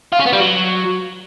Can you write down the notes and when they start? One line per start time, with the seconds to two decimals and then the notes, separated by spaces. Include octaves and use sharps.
0.12 F4
0.19 C#4
0.26 B3
0.33 G3
0.40 F#3